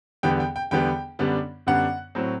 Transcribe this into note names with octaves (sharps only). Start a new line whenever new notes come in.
E2 D3 G3 B3 G5
G5
G5
E2 D3 G3 B3 G5
F#2 D3 G3 B3 D4
F#2 D3 G3 B3 D4 F#5
A2 F#3 C4